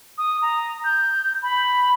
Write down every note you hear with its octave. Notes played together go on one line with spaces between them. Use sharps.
D#6
A#5
G6
B5